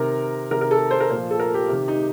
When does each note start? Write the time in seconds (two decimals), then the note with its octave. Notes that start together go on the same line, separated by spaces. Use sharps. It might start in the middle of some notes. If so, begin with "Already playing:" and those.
Already playing: C3 D#3 A#4
0.51 C3 D#3 A#4
0.61 A#4
0.71 A4
0.91 C5
1.00 A#4
1.10 A#2 F3 C5
1.31 A4
1.39 A#4
1.54 G4
1.69 C3 D#3
1.88 D#4